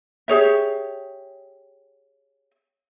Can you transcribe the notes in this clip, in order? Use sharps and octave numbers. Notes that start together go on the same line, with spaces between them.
G4 G#4 C#5 E5